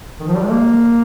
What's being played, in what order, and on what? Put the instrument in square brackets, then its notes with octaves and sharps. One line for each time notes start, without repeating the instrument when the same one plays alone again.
[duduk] D#3
F3
G3
G#3
A#3